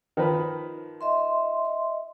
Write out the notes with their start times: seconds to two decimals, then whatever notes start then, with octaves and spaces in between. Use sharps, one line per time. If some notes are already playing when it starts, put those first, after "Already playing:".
0.17 D#3 F3 B4
1.01 D#5 E5 C6